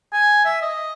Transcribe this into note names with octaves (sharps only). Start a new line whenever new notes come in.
G#5
E5
D#5